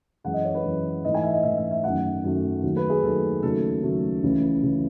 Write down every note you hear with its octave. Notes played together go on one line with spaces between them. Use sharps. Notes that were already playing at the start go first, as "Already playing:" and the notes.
F#2 E3 G#3 F#5
D#5
C#5
B4
F#2 E3 G#3
G#2 E3 A3 D#5
G#5
E5
D#5
G#2 E3 A3 E5
E5
E5
F#2 D#3 F#3 A3 F#5
F#2 D#3 F#3 A3
D#2 D#3 F#3 A3
B4
G#4
D#2 D#3 F#3 A3 A4
D#2 C#3 F#3 A3 A4
D#2 C#3 F#3 A3
C#2 C#3 E3 A3
C#3 E3 A3